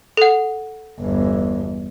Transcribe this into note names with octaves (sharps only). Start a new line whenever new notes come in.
A4 F#5
G1 E2